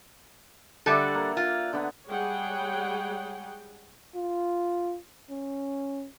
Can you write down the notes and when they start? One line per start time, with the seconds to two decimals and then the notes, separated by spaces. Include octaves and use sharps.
0.86 D3 G3 A4 D5 E5 F#5
1.15 A#3
1.37 F4
1.73 D3 B3
2.08 G3 G#3 G#4 C#5 F#5 G5
4.15 F4
5.30 C#4